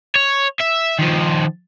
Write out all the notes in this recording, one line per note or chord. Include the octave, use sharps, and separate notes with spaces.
C#5
E5
D#3 F3